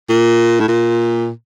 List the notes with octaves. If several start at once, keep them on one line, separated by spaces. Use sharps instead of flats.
A#2
A2
A#2